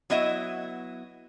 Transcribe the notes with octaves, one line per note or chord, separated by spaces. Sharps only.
F#3 B3 E4 D#5 E5